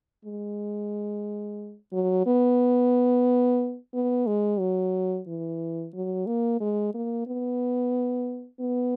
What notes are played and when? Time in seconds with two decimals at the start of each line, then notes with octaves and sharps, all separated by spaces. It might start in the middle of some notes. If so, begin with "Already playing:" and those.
0.25 G#3
1.93 F#3
2.27 B3
3.94 B3
4.27 G#3
4.60 F#3
5.27 E3
5.94 F#3
6.27 A#3
6.61 G#3
6.94 A#3
7.27 B3
8.61 B3